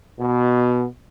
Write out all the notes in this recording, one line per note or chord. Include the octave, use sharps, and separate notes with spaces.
B2